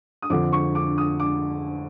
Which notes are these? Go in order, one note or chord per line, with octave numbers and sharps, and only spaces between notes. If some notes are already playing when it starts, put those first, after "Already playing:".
D#6
F2 D3 F3 D6
C#6
D6
D#6
D6